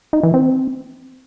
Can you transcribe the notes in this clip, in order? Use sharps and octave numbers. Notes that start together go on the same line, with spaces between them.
D#4
E3
C4